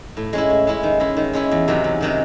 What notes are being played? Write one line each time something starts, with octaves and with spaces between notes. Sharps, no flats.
A2
G#3 C#4 E4
A2
G#3 C#4 E4
D#3
G#3 C#4 E4
D#3
G#3 C#4 E4
E2
C3 D#3 F#3 C#4
E2
C3 D#3 F#3 C#4